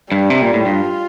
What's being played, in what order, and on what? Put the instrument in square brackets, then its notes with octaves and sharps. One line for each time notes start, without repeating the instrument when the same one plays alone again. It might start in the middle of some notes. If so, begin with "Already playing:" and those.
[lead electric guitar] G2 [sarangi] G3
[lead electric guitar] C3
A#2
A2
[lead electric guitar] G2 [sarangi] F4